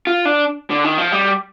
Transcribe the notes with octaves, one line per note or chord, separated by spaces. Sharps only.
F4
D4
D3
D#3
F3
G3